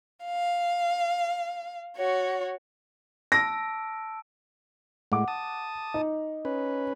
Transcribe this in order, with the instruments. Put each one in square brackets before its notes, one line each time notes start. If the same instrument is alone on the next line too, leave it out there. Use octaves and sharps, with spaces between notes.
[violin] F5
F#4 C#5
[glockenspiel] A5 E6 D7 [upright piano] A#6
[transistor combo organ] A2 G#3 [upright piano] F#5 D6
[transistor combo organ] A5 D#6
[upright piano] D#4
[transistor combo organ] C#4 B4